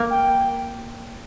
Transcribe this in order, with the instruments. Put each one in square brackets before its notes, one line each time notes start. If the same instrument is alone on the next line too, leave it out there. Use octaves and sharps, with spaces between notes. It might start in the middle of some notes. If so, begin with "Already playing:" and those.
Already playing: [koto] A#3
[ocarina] G5